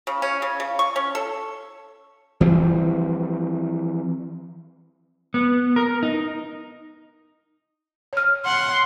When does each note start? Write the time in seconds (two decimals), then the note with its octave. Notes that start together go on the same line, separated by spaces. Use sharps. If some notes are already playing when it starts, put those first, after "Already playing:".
0.07 C#3
0.22 C#4
0.42 C#3
0.60 C#3
0.79 C#6
0.96 C#4
1.15 A4
2.41 E3 F3 G3 C4
5.34 B3
5.76 A#4
6.03 D#4
8.13 C#5 F6
8.46 F#5 C6